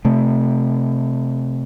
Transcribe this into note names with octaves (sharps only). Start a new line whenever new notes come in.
C3 A3